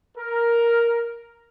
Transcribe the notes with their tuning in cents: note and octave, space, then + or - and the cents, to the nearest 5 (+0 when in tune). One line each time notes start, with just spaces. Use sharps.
A#4 +5